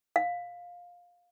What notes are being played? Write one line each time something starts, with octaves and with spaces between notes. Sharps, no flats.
F5